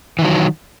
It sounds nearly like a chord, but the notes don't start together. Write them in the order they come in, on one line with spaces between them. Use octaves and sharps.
E3 D#3 F#3